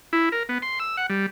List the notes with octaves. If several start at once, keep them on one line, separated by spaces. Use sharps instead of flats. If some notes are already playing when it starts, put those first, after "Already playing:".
E4
A#4
B3
C6
E6
F#5
G3